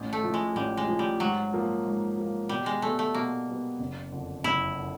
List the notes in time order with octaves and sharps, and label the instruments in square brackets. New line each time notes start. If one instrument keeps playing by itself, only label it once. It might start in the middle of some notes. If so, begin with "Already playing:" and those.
Already playing: [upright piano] A1
[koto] A3
[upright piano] A2 F3
[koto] G#3
[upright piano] A1 [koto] G3
[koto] G#3
[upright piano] A2 F3
[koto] G3
[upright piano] G#2 [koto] F#3
[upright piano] F3 A#3
G#2
F3 A#3
[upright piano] B2 [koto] G3
[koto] G#3
[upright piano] G3 B3 [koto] A3
[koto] A3
[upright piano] B2 [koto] A#3
[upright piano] G3 B3
F#1
F2 D3
[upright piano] F#1 [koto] E4
[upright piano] D3